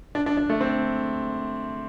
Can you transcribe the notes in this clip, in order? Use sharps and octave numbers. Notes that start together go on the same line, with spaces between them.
D4
D4
D4
A3
C4